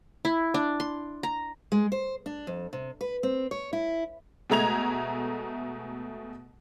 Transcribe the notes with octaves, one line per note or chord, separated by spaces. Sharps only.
E4
D4
C6
A#5
G#3
C5
D4
F2
C3
B4
C4
C#5
E4
B2 G#3 A3 A#5 G#6 F7